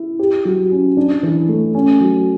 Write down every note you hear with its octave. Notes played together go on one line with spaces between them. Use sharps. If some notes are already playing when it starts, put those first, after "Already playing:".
Already playing: E4
G4
F#3
C#4
D4
E3
A3
C#4
F#3